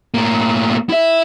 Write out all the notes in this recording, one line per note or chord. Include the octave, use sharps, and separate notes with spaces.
A2 A#3
E4 E5